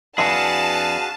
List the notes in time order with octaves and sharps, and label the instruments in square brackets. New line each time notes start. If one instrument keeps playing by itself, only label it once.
[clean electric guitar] F2 D4 E4 [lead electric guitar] F#4 G#4 [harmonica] B4 F5 [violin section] A5